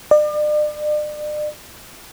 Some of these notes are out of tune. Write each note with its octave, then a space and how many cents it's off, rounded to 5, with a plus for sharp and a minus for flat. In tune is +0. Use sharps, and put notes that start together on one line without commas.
D5 +40